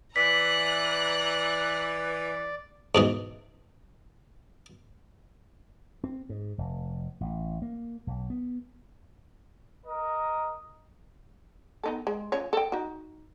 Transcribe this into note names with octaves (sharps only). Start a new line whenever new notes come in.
E3 B4 D5 A#5 F#6 B6
G#2 B2 E3
C4
G#2
F1
A1
A#3
B1
B3
A#4 D#5
B3 D#4 A4
G#3
F3 C#4 C#5
A4 G5
D#4 F#4